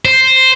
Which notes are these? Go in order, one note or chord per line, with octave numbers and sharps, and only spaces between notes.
C5